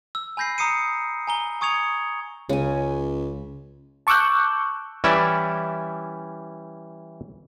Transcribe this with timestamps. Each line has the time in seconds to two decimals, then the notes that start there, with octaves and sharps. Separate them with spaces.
0.15 E6
0.37 G#5 B5 G6 A#6 C7
0.58 A#5 D#6 C7 C#7 D#7
1.27 G#5 A#5 G7
1.61 G#5 C#6 D#6 G#6 C#7 F7
2.49 C#2 C#3 G#5
4.07 A5 C#6 D6 E6 F#6 G6
5.04 E3 G3 C#4 E4 D5 E5